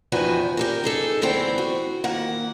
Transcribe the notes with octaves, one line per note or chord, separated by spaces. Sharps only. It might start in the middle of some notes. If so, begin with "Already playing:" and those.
E2 D#3 F3 F#4 B4 G#5
G4 A4 A#4
D#4 G#4 A4
D2 E3 B3 C4 G5
F#4
D#3 A#3 F#5